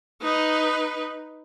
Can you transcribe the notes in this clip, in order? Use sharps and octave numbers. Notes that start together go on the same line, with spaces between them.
D#4 B4